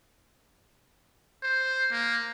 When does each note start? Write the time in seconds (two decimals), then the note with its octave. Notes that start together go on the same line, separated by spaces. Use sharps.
1.43 C5
1.91 A#3